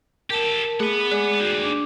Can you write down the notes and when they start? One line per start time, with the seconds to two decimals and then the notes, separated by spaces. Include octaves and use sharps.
0.30 G4 A4 A#4 A5
0.80 A3 G#4 F#5 B5
1.11 G#3 G#4 D5 F#6
1.40 D#4 F#4 G4
1.63 D4